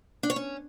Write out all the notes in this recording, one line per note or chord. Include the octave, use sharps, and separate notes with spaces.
D4
C#5
C#4